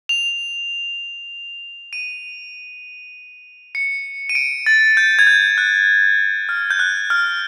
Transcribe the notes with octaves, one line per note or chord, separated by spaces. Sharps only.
F7
D#7
C#7
D#7
D7
A6
G6
G#6
G6
F#6
F6
G6
F#6
F6